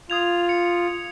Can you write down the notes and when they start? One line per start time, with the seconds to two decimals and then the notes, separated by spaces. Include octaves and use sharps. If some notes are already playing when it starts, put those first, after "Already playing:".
0.10 F4 D#6 G#6 F7
0.49 C#7